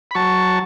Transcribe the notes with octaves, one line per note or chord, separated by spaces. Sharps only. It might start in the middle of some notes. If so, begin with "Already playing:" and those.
B5
F#3 A5 C#6